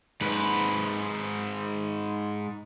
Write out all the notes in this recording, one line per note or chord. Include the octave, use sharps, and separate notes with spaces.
G#2 B4